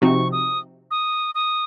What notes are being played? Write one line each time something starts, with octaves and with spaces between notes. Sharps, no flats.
C3 F3 C4 D#4 F#4 C#6
D#6
D#6
D#6